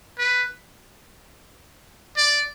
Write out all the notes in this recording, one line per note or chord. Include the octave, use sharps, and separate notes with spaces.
B4
D5